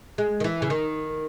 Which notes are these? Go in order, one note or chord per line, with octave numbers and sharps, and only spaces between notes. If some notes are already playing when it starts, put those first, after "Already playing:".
G#3
D#3
E3
C#3
D#3